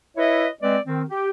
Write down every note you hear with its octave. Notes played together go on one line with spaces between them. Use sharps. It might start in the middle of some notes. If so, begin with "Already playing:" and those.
E4 B4 C#5 D#5 E5
G#3 C4 B4 D5 D#5
D#3 C4
G4